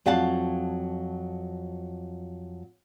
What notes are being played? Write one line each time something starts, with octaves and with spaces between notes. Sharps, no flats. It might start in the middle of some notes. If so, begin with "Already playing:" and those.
F2 F#3 F5 F#5 A5